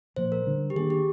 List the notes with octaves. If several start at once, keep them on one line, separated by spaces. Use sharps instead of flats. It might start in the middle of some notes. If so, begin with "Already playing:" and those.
A#2 F3 A#3 C5
A#4
D3 G3 D4
G4
D#3 A#3 D4 G#4
G4